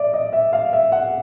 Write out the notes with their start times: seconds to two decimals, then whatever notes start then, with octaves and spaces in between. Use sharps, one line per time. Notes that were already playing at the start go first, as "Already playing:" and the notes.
Already playing: D5 E5
0.14 D#5
0.33 E5
0.53 F5
0.73 E5
0.92 F#5